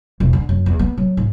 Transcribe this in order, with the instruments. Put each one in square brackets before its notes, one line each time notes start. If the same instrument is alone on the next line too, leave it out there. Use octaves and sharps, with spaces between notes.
[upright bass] E1
D3
F#2
E2
B3
F#3
G#2